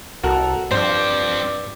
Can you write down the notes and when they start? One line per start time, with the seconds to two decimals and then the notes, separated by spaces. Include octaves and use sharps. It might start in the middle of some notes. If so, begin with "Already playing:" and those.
0.23 C2 F#4 A4 A#4
0.71 G2 F3 C4 C5 D5